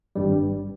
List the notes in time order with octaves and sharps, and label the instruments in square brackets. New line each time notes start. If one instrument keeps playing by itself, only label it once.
[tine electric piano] G#1 G2 G3